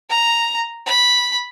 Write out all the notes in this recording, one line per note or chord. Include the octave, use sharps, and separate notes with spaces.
A#5
B5